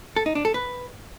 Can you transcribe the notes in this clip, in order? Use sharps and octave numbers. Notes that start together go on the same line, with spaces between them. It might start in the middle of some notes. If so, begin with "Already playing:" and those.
A4
D#4
D4
A4
B4